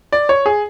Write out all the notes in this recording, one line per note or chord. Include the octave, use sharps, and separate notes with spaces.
D5
C#5
G#4